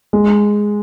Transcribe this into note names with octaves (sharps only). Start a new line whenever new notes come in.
G#3